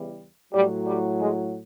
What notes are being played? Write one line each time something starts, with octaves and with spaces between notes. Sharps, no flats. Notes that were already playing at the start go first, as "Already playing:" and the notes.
Already playing: E2 C#3 E3 G3
A2 F#3 G3
G3
G#3